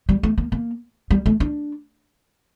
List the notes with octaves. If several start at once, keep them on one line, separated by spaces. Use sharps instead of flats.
G3
A3
A#3
A#3
G3
A3
D4